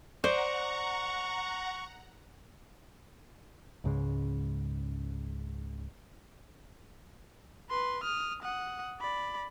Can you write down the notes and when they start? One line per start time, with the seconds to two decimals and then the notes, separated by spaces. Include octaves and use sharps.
0.24 C5 D5 F#5 A#5 C#6
3.84 C#2 G#2 C#3 G#3
7.70 B4 C6
8.04 D#6 F6
8.43 F#5 D#6
9.00 D5 B5